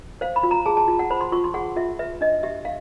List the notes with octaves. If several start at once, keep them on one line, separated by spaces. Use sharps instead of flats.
C5 F5
B5
F4
A#5
G#4 A5
A5
F4
F#5
C5 B5
C6
F4 C#6
C6
G#4 F#5
F4 E5
B4 E5
D4 D#5
G4 E5
F5